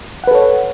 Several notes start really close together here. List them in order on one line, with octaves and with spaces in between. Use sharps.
F#5 B4 A4 C#5